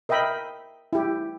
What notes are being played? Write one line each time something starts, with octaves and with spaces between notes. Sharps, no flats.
A#4 D#5 E5 G5 B5
E4 G4